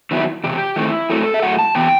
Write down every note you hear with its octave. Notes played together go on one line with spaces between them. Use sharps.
D#3 F#3 B3 E4
E2 C3 G4
D#3 A3 C4 E4
F#2 F#3 A3 C4 A4
E5
A2 F#3 A3 F#5
A5
C3 E3 B3 G5